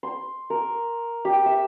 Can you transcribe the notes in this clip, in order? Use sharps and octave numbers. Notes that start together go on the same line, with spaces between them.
C6
A#4
G4
E5